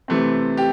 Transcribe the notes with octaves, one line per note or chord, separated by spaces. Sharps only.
C3 E3 A3 C4
G4